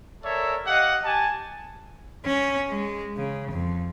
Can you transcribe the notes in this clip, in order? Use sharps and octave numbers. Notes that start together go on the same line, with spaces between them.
A4 A#4 C#5 D5 E5
G4 D#5 F5 F#5
G4 G#5 A5
C#4
G#3
C#3
F2